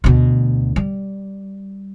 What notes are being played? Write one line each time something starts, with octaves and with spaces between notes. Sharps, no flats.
D2 B2
G3